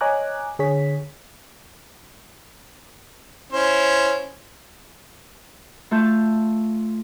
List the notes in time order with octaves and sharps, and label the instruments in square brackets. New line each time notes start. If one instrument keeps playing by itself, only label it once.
[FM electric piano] C#5 D#5 G#5 A#5 D6 F#6
D3 G#4 C#5 B6
[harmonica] C#4 E4 C5
[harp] A3 F4 A5 G6